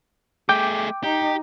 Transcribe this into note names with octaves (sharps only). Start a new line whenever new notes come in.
A3 G#4 G5 D6
D#4 G4